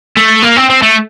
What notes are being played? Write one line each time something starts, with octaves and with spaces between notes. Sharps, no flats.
A3
A#3
C4
C4
A3